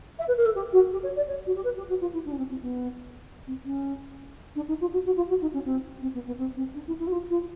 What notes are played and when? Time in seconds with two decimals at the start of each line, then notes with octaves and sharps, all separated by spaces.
0.19 E5
0.28 B4
0.37 A#4
0.45 A4
0.55 G4
0.73 F#4
0.92 G4
1.03 C#5
1.16 D5
1.28 C#5
1.46 F#4
1.55 G4
1.64 B4
1.77 G4
1.89 F#4
2.01 F4
2.13 E4
2.25 D4
2.32 C#4
2.38 C4
2.50 C4
2.62 B3
3.47 C4
3.65 C#4
4.55 D4
4.68 D#4
4.80 F4
4.93 F#4
5.05 F#4
5.16 F4
5.29 F#4
5.41 D#4
5.53 C#4
5.65 C4
6.02 C4
6.14 B3
6.26 B3
6.38 C4
6.56 C4
6.75 D4
6.87 E4
6.99 E4
7.07 F#4
7.12 F4
7.29 F4